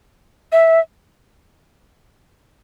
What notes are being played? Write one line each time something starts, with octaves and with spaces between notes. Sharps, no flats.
E5